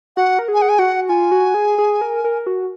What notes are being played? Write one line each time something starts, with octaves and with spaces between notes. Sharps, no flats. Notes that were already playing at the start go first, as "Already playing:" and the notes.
F#4 F#5
A#4
G#4
G#5
F#5
G#5
F#4 F#5
F4 G#5
F#4
G#4
G#4
A#4
A#4
F#4